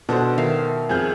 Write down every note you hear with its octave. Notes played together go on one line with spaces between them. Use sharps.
B2 D4 F#4 A4 C5 F#5
D#3 E5 F5
F2 G#4 G#5 F6 G6